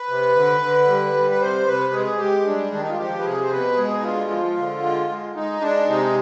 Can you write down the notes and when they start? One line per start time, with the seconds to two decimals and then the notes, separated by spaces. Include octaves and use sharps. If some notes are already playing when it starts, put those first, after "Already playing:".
Already playing: B4
0.09 C3
0.35 D3
0.61 D3
0.87 G3
1.14 G3
1.30 B4
1.40 C3 C5
1.67 C3 B4
1.93 G#3 G#4
2.19 G#3 G4
2.45 G3 D4
2.72 D#3 D4
2.82 D#4
2.89 F4
2.99 F3 G4
3.19 B4
3.25 C3 G#4
3.43 C5
3.51 B2 B4
3.77 G#3 G#4
3.98 D#4
4.04 D3 F4
4.30 F3
4.56 D3
4.83 G#3
5.09 G#3
5.35 G#3 D#4
5.61 G#3 D4
5.88 C3 D#4